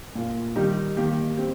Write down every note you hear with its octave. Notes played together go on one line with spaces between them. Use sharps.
A#2 A#3 F4
D#3 G3 D#4 G4
D#3 A#3 G4
C4 G4